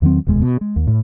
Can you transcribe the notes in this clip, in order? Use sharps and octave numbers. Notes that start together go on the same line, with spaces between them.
E2 D#3 F#3 C4
F1 D#2 B2 G#3
B2
G#3
D#2
A2